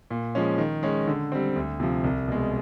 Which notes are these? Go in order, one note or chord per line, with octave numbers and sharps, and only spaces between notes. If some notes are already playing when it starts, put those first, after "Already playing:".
A#2
F3 G#3 C#4
D#3
G#3 C#4
D3
G3 C4
D2
C3 F3
C2
B2 G#3